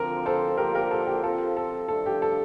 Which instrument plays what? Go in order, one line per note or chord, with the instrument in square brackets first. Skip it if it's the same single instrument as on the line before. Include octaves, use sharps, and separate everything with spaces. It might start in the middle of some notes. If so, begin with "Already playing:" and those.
Already playing: [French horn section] D2 D3 F3 C4 F4 [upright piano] A#4
[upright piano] A4 C5
[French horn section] D3 F3 A#3 F4 C5 [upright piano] G4 A#4
[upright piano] G4 A#4
A4
G4
[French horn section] F3 C4 F4 C5 [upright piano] A4
[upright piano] A4
[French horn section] G2 F3 A3 D4 [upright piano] A4
[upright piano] G4
A4